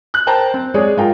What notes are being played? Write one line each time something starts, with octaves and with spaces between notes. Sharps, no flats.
F#6
A#4 C5 G5 A5 A#5
C4
G#3 G#4 C#5 D5
G#2 F4 A#4 G5